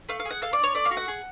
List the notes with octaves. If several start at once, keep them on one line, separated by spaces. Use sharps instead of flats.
A3 F5
F5
G#4
F#5
A4 F5
D5
D4 C#5
A3 D5
F5
F#4
F#5
G#4